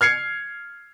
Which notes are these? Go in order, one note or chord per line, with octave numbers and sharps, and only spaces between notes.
F6 G#6 C7 C#7